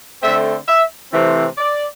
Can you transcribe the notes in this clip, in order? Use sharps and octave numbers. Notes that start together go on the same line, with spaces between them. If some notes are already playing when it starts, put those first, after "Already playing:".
D3 A3 C4 E5
E5
C3 E3 A3 C4
D5